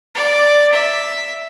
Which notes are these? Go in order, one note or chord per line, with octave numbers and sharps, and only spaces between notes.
D5
E5